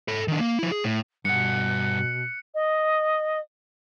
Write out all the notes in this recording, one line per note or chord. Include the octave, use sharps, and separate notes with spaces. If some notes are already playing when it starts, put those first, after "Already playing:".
A4 B5
D#3 D4
A#3
F3 E4
G#4
A2
G2 B2 F#5 F#6 C#7
D#5